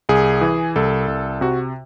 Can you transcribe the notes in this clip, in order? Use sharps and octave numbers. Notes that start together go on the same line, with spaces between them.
C2 G#4
E3
C2 A4
C2
C3 F#4